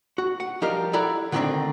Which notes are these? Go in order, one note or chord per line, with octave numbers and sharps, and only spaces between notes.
F#4
F#5
F3 G3 G4 A#4 D#5 F5
E4 A4 D5 F#5 A#5
D3 D#3 G3 A3 C4 D4